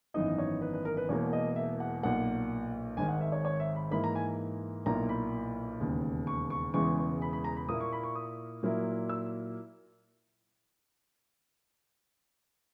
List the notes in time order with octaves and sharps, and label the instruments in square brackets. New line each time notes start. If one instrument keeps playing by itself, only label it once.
[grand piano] G#1 F#2 E3 B3 D#4 D#5
C#5
B4
B4
A#4
B4
E1 E2 B2 A#3 C#5
D#5
E5
F#5
B1 A#2 A#3 F#5
G#1 G#2 D#3 G#5
F#5
E5
C#5
C#5
E5
B5
G#2 E3 A#3 E4 B5
A#5
G#5
B1 A#2 A#3 E4 A#5
B5
E1 D#2 C#3
C#6
C#6
E1 E2 C#3 E3 G#3 C#6
C#6
B5
B5
A#5
B5
A#2 A#3 E4 D#6
C#6
B5
C#6
D#6
A#2 F#3 A#3 E4
E6